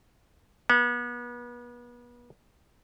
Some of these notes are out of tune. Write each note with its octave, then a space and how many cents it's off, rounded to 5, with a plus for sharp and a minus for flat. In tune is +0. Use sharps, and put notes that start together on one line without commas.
B3 -35